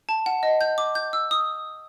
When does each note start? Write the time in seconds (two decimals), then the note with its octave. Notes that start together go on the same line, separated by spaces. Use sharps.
0.09 A5
0.26 F#5
0.43 D#5
0.61 G6
0.78 D6
0.95 G6
1.13 E6
1.31 D#6